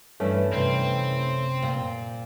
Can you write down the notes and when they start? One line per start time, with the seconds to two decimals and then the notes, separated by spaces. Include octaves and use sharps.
0.20 G2 E3 A3 C#4
0.53 F#2 C3 C4
1.62 A#2